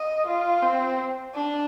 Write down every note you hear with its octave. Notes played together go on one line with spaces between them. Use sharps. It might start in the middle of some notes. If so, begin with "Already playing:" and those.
Already playing: D#5
F4
C4
D4